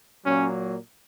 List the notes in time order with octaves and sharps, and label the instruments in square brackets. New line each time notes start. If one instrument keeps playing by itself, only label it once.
[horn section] A#2 F#3 A#3 C#4